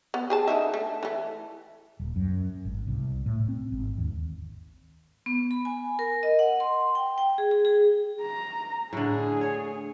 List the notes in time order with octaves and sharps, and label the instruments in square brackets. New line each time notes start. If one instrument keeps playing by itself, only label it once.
[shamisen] B3
G4 G#4 A5
D3 D#4 E5
A3
E3 A3
[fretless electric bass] D#1
F#2
G#1
C2
A2
C4
G#1
D#2
[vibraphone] B3
B5
G#5
A#4
D#5
F#5
C6
G5
G5
G#4
G#4
G#4
[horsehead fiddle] A#5
[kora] A2 D3 [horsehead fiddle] G#4
[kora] C#5